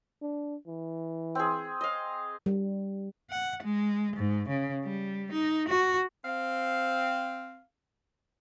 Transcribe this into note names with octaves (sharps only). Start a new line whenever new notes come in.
D4
E3
C4 G#4
D#5 F5
G3
F#5
G#3
G#2
C#3
G3
D#4
F#4
C4 F5